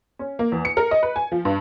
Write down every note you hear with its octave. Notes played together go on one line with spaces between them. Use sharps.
C#4
A#3
E2
C#7
A#4
D#5
B4
G#5
F3
G2